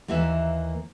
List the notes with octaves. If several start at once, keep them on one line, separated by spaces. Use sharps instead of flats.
D#2 E3 A#3 B4 E5